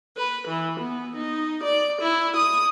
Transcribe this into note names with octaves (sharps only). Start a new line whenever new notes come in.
B4
E3
B3
D#4
D5
E4
D#6